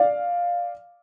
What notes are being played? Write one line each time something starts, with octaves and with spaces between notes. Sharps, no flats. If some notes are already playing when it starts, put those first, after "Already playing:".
Already playing: D5 F5